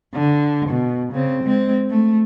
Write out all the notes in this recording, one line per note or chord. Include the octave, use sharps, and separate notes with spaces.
D3
B2
C#3 C4
G#3 C4
A3